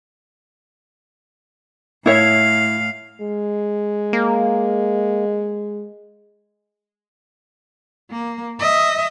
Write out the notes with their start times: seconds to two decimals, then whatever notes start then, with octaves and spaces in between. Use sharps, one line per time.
2.06 A2 E4 C#5 E5 F5
3.21 G#3
4.13 A#3
8.10 A#3
8.59 D#5 E5